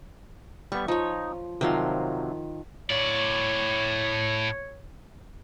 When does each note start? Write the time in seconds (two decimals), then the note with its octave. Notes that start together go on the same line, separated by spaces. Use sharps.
0.72 G3 B3 C#6
0.88 F3 D#4 C#5
1.61 C3 D#3 F3 F#3 F5 C6
2.90 A2 C#5 D5